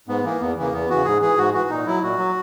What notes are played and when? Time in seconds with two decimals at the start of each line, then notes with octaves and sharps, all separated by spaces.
0.08 G#2 B3
0.24 E3 A#3
0.40 E2 B3
0.57 C#3 E3 A#3
0.72 E2 B3
0.89 C#3 E3 F#4
1.05 G#2 G#4
1.22 E3 G#4
1.38 G#2 F#4
1.54 E3 F#4
1.69 A#2 D#4
1.86 F#3 E4
2.02 A#2 F#4
2.18 F#3